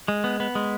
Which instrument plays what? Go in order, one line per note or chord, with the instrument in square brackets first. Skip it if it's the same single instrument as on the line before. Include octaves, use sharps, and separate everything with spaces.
[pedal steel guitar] G#3
B3
B3
G#3